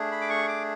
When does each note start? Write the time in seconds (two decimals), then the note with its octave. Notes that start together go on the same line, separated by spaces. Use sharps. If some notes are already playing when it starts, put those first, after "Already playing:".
Already playing: A3 D4 G#4
0.12 B5
0.21 D6
0.30 C#6
0.48 D6